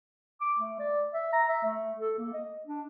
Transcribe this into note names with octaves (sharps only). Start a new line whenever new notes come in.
D6
A3
D5
E5
A#5
E5
A3
A4
A#3
D#5
D4